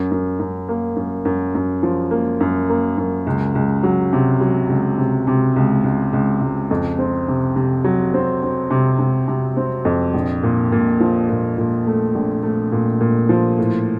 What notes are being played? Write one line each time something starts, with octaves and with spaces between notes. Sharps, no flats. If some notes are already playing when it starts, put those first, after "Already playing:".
Already playing: F#2
F#2
F#2
A#3
F#2
F#2
F#2
F3
A#3
F#2
A#3
F#2
C#2
C#2
F#3
C3
F#3
C#2
C3
C3
C#2
C#2
C#2
C#2
F2
C4
C3
C3
F#3
C4
C4
C3
C3
C3
C4
F2
A#1
A#2
A#2
F3
A#2
A#2
A3
A#1
A3
A#2
A#2
F3
A2